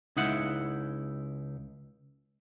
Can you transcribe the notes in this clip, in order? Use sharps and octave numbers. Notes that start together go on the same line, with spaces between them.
C#2 D#4 E4 F#5